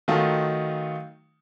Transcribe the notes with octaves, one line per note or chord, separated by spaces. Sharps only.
D#3 F#3 A3 D#4 F4